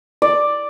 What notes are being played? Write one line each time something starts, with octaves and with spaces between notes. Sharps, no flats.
D5